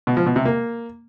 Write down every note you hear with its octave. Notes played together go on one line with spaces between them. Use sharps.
B2
F3
B2
C3
A#3